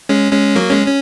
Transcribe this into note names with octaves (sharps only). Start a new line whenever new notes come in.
G#3 C#4
G#3 C#4
F#3 A#3
G#3 C#4
C#4